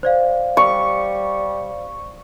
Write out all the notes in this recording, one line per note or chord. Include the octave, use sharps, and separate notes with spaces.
C5 D5 F5
G3 C#6